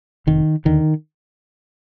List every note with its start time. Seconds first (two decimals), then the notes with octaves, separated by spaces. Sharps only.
0.27 F1 D#3
0.65 D#2 D3 D#3